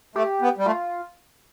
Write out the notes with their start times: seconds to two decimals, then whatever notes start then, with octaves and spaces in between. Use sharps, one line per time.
0.16 A3 G4
0.41 B3
0.58 G3
0.66 A3 F4